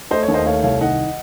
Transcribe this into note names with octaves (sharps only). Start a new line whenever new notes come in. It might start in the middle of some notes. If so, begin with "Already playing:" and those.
A3 C5 D#5
C#5
D#2
C5 D#5
A3 C#5 F5
C2 C#5 F5
D#3 D#5 F#5